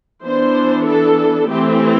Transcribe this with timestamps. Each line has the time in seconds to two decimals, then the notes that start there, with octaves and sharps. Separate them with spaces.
0.24 E3 B3 D4 C5
0.86 A4
1.49 E3 A3 C4 G4